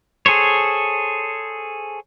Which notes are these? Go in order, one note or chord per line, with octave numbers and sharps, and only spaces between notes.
G#4 A4 C5 C#5